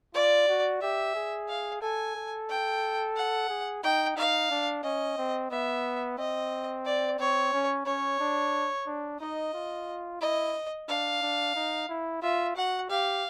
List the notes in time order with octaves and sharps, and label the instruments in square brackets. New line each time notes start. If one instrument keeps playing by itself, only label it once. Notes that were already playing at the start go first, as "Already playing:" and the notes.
[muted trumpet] F4 [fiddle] D5
[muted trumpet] F#4
[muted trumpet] G4 [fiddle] E5
[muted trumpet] G#4
[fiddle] F5
[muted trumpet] A4 [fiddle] G#5
[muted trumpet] A4
[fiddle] G5
F#5
[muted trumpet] G#4
[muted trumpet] D#4 [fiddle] G5
[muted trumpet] D#4 [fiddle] F5
[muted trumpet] D4
[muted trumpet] C#4 [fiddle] D#5
[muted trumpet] C4
[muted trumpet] B3 [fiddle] E5
[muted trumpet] C4 [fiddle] D#5
[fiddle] D5
[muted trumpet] C4 [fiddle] C#5
[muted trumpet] C#4
[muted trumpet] C#4 [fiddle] C#5
[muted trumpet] D4
D4
[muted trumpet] D#4 [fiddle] D#5
[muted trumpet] F4
[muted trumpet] E4 [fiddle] D#5
[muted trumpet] D4 [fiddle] F5
[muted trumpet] D4
D#4
E4
[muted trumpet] F4 [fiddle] E5
[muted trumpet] F#4 [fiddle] F#5
[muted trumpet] G4 [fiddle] F5